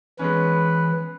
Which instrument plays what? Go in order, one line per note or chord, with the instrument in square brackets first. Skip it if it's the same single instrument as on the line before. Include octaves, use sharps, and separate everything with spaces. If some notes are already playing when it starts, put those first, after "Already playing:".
[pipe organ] E3 [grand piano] G#3 B3 C#4 [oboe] B4